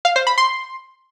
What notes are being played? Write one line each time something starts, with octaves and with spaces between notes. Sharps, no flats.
F5
C5
B5
C6